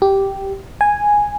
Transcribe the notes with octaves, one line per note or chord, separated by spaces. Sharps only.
G4
G#5